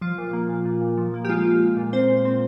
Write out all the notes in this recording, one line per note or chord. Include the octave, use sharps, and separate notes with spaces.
F3 F4
A#2
A#3
A#2
A#2
A#2
F3
A#3
G4
G#3 F4
F4
F4
A#2
C4 C5
A#2
C4